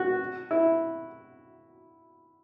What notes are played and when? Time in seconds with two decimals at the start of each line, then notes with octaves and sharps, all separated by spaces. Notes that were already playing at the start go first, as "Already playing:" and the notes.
Already playing: F#4
0.51 E4